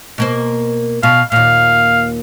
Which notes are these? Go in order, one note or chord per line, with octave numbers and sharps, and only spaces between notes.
B2 A#3 C5
B2 F5
D#2 A#2 F5